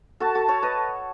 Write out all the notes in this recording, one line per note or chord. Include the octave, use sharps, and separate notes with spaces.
F#4 A4 A5
F#4 A4
A4 C#5
B4 D#5